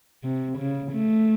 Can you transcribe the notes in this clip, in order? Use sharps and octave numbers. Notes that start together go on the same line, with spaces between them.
C3
C#3
A3